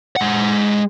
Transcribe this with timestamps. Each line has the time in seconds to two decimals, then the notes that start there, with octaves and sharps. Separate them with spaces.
0.16 G#3 F#5